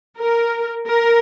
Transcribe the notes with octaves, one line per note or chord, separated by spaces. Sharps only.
A#4
A#4